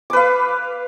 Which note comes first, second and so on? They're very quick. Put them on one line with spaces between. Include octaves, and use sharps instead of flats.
D6 B4 F5